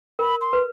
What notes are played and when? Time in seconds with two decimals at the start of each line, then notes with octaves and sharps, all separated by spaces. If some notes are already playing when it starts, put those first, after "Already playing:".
0.19 A#4 B5
0.41 C6
0.53 B4